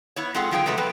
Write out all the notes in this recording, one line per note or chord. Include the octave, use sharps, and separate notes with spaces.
B3 E4 C#5
G#3 C4 F4 G#4 A4 F#5
D3 F#3 F4 G#4 F#5 G5
C3 F#3 G#3 A3 A4 B4
F3 B3 A4 B4